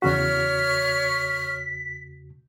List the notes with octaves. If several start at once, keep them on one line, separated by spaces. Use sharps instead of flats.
E2 C#3 F#4 C#5 F6 B6